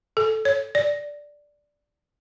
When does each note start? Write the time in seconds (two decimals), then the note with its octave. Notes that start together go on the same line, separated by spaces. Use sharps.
0.17 A4
0.45 C#5
0.75 D5